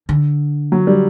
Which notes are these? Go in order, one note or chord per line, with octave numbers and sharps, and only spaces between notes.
D3
F#3
G3